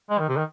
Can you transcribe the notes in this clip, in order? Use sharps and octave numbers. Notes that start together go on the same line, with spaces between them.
G#3
D#3
C3
D#3